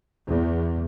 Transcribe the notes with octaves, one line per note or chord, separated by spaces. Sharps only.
E2